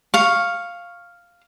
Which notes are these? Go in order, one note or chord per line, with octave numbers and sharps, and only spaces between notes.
F5 C#6